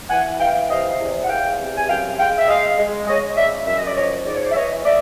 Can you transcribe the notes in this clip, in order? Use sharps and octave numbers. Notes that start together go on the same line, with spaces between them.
E3 F#5 G#5
E3 F5 G5
C3 D#5 F5
E2
F#5
E2 F5 G5
C3
G#5
F#2 F5 G5
G#3 F5 G5
E5
G#3 D#5 F5
G#3
G#3 C#5 D#5
C#3 D5 E5
F#2 E5
D#5
D5
F3 C#5 D#5
G#2 D5
C#5
C5 D5
E5
E3 C#5 D#5
A3 D5 E5